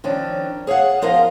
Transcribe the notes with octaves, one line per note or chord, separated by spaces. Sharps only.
D#3 F3 C#4 D4
G#4 C#5 F5 F#5
F3 B3 F4 A#4 D#5 F5